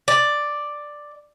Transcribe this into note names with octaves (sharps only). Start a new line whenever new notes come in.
D5